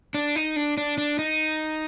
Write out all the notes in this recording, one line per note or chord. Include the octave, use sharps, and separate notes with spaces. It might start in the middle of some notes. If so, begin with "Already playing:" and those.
D4
D#4
D4
D4
D4
D#4